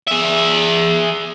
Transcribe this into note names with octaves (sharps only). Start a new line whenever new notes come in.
G#4 E5